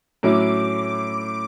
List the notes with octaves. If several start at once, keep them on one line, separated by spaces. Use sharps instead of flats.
A2 F#3 C#4 E4 D6